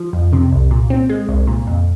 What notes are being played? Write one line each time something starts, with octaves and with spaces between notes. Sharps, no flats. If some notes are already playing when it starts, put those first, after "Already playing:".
Already playing: F3
F2
C3
C2
A#2
C4
G#3
C2
A#2
F2